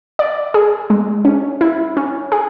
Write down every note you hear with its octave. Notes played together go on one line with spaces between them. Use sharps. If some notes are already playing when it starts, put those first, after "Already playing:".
D5
G#4
G#3
C#4
E4
C#4
G#4